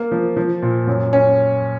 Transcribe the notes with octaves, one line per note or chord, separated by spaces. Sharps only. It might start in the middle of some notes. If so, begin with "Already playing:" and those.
Already playing: A#3
F3
F3
A#2
F#2
C#4